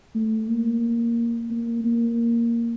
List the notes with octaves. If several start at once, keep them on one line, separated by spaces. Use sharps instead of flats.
A3
A#3
A#3
A#3